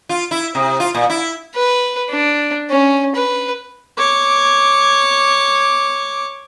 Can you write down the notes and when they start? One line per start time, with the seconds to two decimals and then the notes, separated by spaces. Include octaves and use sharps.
0.09 F4
0.31 E4
0.55 C3
0.80 F4
0.94 A#2
1.10 E4
1.55 B4
2.11 D4
2.70 C#4
3.15 B4
3.98 C#5 D6